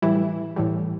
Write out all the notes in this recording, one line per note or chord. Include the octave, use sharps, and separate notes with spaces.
A2 E3 G3 E4
A2 E3 G3